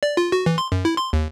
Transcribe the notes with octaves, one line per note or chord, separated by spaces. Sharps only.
D5
F4
F#4
E3
C6
F#2
E4
C6
D#2